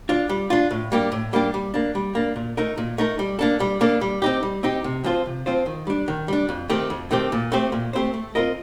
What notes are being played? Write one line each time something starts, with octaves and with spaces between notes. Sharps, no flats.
D4 F4
G3
D4 F4
A2
G3 A#3 D4 G4
A2
G3 A#3 D4 G4
G3
A#3 D4
G3
A#3 D4
A#2
A3 D#4 A#4
A#2
A3 D#4 A#4
G3
A#3 D4 A4
G3
A#3 D4 A4
G3
C4 D#4 G4
G3
C4 D#4 G4
C3
F3 C4 F4 C5
C3
F3 C4 F4 C5
D#3
G3 D4
D#3
G3 D4
F2
D#3 A3 C4 G4
F2
D#3 A3 C4 G4
A#2
A3 C4 G4 C5
A#2
A3 C4 G4 C5
A3
C4 F4 A#4 D#5